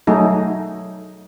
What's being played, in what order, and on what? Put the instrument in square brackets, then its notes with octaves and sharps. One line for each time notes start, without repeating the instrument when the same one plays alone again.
[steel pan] F#3 A3 D#4 G#4